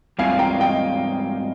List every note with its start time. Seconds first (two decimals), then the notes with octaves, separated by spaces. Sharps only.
0.19 G#2 G3 C4 F4 F5 G#5
0.39 G5 A#5
0.60 D#5 G5